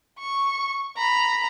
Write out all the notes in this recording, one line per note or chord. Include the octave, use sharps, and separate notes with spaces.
C#6
A#5 B5